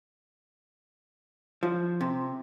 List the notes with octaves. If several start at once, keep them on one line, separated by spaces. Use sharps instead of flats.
F3
C3